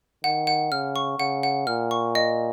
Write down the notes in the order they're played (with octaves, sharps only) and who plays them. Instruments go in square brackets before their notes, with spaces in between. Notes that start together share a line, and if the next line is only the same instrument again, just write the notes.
[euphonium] D#3 [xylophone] F#5
[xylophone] F#5
[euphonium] C#3 [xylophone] F6
[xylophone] C#6
[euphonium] C#3 [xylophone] F#5
[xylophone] F#5
[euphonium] A#2 [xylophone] F6
[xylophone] C#6
D#5